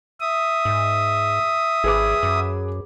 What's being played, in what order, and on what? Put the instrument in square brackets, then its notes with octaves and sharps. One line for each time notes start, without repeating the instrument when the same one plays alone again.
[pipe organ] E5 D#6
[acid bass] G#2
[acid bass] G#1 [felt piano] G#4 B4 D6
[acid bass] F#2